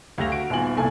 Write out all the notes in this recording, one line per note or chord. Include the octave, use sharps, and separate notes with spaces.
D2 A3 G4 F5 A#6 F7
F#4 D7
D#1 B3 F4 G#5 F#7
C2 A#2 A4 G#5 A5